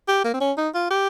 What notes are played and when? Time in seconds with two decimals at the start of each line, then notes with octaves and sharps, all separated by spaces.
0.08 G4
0.24 A#3
0.33 C4
0.41 C#4
0.57 D#4
0.74 F4
0.90 G4